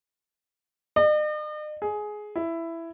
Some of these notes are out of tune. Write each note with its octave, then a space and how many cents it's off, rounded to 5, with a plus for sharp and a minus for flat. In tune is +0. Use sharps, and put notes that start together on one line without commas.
D#5 -45
G#4 +15
E4 +10